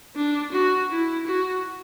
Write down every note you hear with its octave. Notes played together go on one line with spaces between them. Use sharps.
D4
F#4
E4
F#4